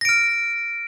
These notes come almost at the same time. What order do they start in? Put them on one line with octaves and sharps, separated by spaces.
A#6 D7 F6